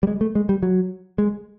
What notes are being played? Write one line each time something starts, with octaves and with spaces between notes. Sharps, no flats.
G3
G#3
A3
G#3
G3
F#3
G#3